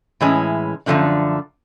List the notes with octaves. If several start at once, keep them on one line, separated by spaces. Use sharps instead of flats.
A2 E3 G#3 C#4 E4
F#2 D3 F3 A3 D4